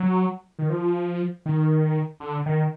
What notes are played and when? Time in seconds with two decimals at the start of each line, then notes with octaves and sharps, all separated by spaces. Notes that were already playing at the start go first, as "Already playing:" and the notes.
Already playing: F#3
0.59 D#3
0.70 F3
1.46 D#3
2.20 D3
2.46 D#3